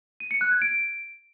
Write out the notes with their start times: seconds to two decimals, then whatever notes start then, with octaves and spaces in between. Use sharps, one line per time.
0.20 D#7
0.31 C#7
0.41 F#6
0.51 G#6
0.62 D7